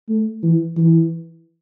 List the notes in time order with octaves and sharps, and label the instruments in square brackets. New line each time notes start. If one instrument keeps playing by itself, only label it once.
[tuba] A3
E3
E3